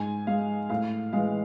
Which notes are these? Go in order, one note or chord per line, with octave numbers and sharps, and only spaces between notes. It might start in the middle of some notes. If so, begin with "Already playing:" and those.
Already playing: G#2 G#5
G#3 F5
A2 F5
E3 G#3 F5